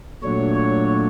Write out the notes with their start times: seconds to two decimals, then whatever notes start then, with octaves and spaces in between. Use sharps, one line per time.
0.23 A#2 F#3 A3 D4 C#5
0.55 C#5